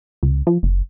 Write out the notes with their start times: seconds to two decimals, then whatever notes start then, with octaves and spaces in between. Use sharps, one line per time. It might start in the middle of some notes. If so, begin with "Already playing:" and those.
0.23 C#2
0.47 F3
0.63 F#1